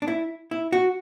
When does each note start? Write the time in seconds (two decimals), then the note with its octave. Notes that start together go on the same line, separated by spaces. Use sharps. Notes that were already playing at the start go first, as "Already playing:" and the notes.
0.02 D4
0.08 E4
0.51 E4
0.72 F#4